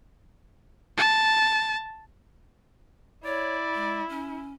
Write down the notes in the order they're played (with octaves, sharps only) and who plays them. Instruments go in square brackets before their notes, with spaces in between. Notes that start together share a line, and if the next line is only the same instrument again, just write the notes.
[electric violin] A5
[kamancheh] E4 [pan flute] C#5 [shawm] D5
[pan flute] G#3
C#4